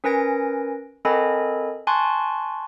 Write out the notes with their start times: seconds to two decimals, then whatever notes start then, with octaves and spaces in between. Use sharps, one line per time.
0.04 C#4 A#4 B4 G#5 A#6 D7
1.05 C4 A4 A#4 D#5 G#5 B5
1.87 G#5 A5 C6 C#6 F#6